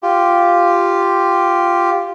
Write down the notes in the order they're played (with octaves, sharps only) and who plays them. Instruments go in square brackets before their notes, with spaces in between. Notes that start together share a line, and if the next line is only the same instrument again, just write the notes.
[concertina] F4 G4